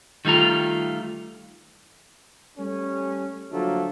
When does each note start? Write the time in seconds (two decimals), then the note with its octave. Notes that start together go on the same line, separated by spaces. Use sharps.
0.25 D#3 G3 A3 F4 A#5
2.58 G3 A3 C#4
3.51 D3 F3 F#3 A3 A#3